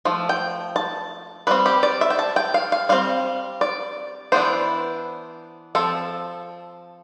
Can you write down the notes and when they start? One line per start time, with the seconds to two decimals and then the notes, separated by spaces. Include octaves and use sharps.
0.05 F3 A3
0.29 G5
0.76 A5
1.47 G3 C4 B4
1.66 G4
1.83 D5
2.01 E5
2.10 G5
2.19 A5
2.36 G5
2.54 F5
2.72 F5
2.89 G3 C4 F5
3.61 D5
4.32 E3 B3 D4 C5
5.75 F3 C4 A4